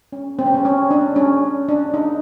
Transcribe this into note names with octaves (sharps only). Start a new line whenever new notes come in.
C#4
C4
C#4
C4
C#4
D4
C#4
D4
D#4